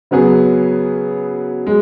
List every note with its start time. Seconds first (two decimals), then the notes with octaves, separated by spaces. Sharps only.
0.11 C#3 F#3 B3 G#4
1.67 G#3